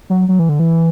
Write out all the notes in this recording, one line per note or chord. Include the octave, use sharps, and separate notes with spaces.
F#3
F#3
E3
D3
E3